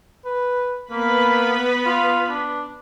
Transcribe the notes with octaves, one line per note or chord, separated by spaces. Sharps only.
B4
A#3 B3 B4 B5
F4
D4